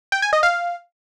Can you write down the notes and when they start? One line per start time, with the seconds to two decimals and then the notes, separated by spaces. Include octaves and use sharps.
0.12 G5
0.22 G#5
0.33 D#5
0.43 F5